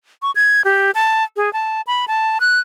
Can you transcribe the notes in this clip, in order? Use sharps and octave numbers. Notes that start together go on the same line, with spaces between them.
C#6
G#6
G4
A5
G#4
A5
B5
A5
F#6